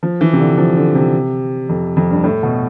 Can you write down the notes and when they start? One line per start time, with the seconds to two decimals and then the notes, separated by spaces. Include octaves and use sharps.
0.03 F3
0.21 E3
0.33 C3
0.40 D3
0.58 F3
0.76 D3
0.95 C3
1.69 F2
1.97 F2
2.11 G2
2.24 A2
2.43 B2